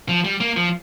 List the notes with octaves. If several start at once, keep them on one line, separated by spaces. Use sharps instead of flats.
F3
G3
A#3
F3